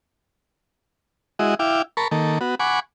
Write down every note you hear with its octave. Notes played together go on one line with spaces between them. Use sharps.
G#3 E4 F#4 D#5
E4 F5 G5 D6
A#4 A5 B5 C#6
D#3 A#3 A4
B3 F#4
F#5 G#5 B5 C#6 D6